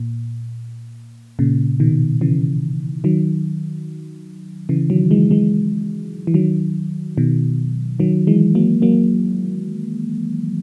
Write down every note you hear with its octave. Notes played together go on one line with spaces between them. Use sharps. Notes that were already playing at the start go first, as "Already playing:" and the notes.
Already playing: A#2
A#2 C#3
B2 D#3
C#3 E3
D#3 F#3
C#3 E3
D#3 F#3
E3 G#3
E3 G#3
E3
D#3 F#3
B2 D#3
D#3 F#3
E3 G#3
F#3 A#3
F#3 A#3